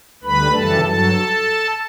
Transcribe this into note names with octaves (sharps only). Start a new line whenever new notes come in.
D2 D3 G3 B4 B5
F#2 C#3 E3 G3 A4 A5
G2 F#3 A4 A5